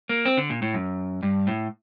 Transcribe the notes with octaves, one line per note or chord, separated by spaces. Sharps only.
A#3
C4
D3
A#2
A2
F#2
G2
A2